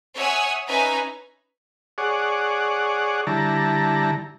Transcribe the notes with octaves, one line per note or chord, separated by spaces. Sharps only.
C#5 E5 F#5 G#5 D#6 E6
C#4 D#4 B4 E5 G#5 A#5
G#4 C#5 D5 F#5
D3 G3 E4 A5 A#5